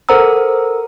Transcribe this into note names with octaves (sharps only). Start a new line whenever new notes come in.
A4 A#4 C5 F#5 A#5 E6